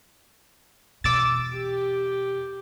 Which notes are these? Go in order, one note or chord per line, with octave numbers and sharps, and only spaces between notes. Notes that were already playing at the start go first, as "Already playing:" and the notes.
E2 B2 D6 E6 A6
G4